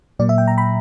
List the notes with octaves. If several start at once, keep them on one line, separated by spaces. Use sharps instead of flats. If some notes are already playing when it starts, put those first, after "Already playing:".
A#2 F#3 A#3 D5
E5
G5
A#5
B5